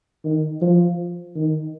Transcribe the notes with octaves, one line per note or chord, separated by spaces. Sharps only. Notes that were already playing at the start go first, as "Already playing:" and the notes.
D#3
F3
D#3